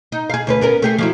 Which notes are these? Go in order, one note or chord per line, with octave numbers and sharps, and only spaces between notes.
D#4
G#4 F5
D2 C#4 B4
B3 C#4 A#4
A3 G4 G#4
F3 F#3 E4